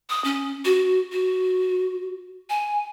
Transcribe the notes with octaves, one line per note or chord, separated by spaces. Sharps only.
D#6
C#4
F#4
F#4
G#5